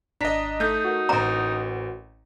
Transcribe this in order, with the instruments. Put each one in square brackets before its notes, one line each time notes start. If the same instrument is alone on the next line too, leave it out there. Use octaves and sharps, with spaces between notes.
[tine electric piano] G#1 A#5 B6 [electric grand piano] D4 D#5
[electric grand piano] A3 G6 [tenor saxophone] D#4
[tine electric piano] F#4 A#4
[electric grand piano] A1 C4 [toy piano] A#5